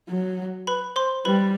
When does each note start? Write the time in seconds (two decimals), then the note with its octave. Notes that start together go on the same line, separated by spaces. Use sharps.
0.09 F#3
0.67 B4 B5
0.96 C5 C6
1.25 G3 B4 B5